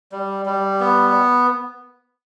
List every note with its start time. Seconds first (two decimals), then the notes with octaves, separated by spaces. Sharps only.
0.12 G3
0.46 G3
0.80 B3